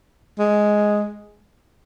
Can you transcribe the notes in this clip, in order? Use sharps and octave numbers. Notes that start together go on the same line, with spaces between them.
G#3